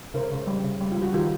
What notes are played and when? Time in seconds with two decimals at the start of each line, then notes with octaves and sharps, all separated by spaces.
0.14 C#3 A#4 C5
0.31 C#3
0.47 G3
0.64 C#3
0.81 G3
0.92 F4
0.97 G3 F#4
1.13 D#3 F4 G4